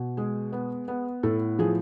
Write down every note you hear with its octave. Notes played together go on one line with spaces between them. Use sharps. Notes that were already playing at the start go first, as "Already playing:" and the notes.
Already playing: B2
G#3 G#4
B3
B3
A2 A4
F3 G#4